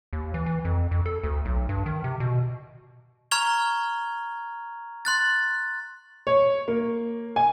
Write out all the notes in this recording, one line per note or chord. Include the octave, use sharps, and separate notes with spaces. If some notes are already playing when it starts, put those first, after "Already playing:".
D#2
E3
E3
F2
F2
A4
D2
B1
G2
D#3
C3
B2
A#5 C#6 F6 G#6 F7 G7
C6 F#6 A6
C#5
A#3
G#5